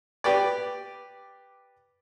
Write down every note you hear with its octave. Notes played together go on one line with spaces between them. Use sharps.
G4 B4 D5